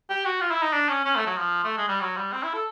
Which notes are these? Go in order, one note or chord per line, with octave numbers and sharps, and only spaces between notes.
G4
F#4
F4
E4
D#4
D4
C#4
C#4
A3
F#3
F3
A3
G#3
G3
F#3
G3
C4
E4
A4